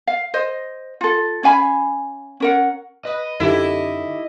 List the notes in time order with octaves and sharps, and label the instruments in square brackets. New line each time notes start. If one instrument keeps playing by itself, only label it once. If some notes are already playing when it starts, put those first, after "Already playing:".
[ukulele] F5
C5 D#5
F4 A4
C#4 F5 G#5 B5
C#4 A#4 F#5
[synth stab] B4 [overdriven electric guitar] D#5
[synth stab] F#2 D3 [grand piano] D#4 G4 A4 [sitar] E4